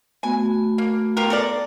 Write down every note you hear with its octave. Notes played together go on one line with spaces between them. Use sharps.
A3 B3 F#4 G#5
A#3
F4 G4 A#4
A4 A#4 D5